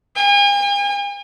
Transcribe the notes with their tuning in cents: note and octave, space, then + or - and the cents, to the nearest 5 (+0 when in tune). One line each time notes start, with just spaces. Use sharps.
G#5 -45